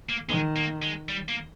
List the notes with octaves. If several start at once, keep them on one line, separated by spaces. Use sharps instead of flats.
A#3
D#3 G#3
A#3
G#3
G3
A#3